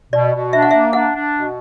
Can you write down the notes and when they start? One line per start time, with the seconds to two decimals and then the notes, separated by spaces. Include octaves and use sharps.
0.13 B2 D5
0.34 B2
0.53 D4 E5
0.62 F#5
0.71 A#3 E5
0.93 D4 F#5
1.14 D4
1.33 B2